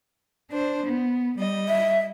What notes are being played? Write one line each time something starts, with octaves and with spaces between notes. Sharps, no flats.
D4 C5
B3
G3 D#5
E5